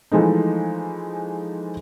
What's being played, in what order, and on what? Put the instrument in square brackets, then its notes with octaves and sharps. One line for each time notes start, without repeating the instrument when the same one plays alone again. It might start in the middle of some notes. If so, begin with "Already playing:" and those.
[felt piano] E3 F3 G#3 A3 D#4